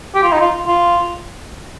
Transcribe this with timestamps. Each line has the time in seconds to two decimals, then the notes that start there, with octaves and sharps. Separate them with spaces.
0.15 G4
0.23 F4
0.32 D#4
0.40 F4
0.67 F4